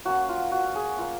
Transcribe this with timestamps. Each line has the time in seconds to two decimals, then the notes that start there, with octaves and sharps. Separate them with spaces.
0.05 F#3 A#3 C#4 F#4
0.29 F4
0.52 F#4
0.75 G#4
0.98 A#3 F4